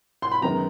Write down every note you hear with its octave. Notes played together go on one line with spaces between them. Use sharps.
C6
B5
F#2 D#3 G#3 B3 A#5